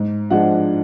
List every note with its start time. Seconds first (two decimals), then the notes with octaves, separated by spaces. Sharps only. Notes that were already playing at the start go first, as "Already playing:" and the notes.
Already playing: G#2
0.30 F3 G#3 D4 F#5